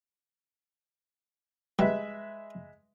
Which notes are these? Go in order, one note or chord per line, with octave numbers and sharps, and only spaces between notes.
G3 G#3 B4 E5